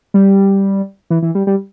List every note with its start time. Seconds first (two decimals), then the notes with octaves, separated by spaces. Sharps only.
0.14 G3
1.10 E3
1.22 E3
1.35 G3
1.47 G3